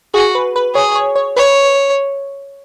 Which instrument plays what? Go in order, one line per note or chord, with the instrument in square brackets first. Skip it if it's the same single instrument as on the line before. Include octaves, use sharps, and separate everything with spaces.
[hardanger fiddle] F#4 [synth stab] G#4
[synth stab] B4
B4
[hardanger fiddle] G#4 [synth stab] C#5
[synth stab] C#5
C#5
[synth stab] B4 [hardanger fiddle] C#5